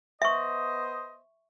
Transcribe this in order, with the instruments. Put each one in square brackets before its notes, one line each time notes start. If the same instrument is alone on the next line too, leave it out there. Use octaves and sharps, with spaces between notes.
[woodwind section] B3 C5 D#5 [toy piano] E5 C#6